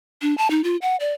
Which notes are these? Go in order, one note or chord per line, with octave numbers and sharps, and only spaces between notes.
D4
A5
D#4
F4
F#5
D5